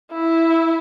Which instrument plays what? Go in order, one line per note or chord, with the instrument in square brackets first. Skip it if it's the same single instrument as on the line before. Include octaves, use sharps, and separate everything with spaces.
[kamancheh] E4